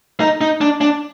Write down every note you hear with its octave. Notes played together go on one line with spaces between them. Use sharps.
D#4
D#4
D4
D4